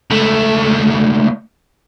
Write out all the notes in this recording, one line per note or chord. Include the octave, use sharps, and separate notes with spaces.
C#2 A3